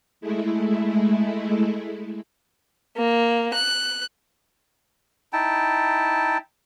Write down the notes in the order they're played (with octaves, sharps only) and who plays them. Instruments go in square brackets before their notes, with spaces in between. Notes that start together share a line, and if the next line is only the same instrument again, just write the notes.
[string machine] G#3 A3 E4
[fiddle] A#3
F#6
[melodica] D#4 E4 G5 A5